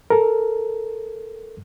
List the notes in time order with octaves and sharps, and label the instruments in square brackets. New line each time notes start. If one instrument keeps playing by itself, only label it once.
[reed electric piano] A4 A#4